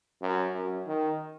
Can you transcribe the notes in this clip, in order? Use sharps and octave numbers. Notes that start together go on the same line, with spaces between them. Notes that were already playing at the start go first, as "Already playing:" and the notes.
F#2
F#2
D#3